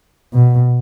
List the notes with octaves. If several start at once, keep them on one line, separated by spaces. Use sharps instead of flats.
B2